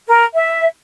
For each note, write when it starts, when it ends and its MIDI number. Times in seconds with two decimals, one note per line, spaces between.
0.07 0.24 70
0.34 0.67 76